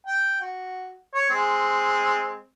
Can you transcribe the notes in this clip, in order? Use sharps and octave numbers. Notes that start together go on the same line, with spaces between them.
G5
F#4
C#5
G#3 C4